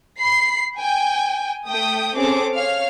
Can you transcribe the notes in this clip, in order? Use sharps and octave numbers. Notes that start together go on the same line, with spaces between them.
B5 C7
G5 G#5
A3 G5 D#6
C4 C#4 G#4 A4 D6
C#5 F5 F6